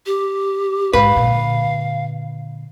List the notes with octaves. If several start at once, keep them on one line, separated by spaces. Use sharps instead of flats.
G4
G#2 C#3 B4 F5
A#2 D3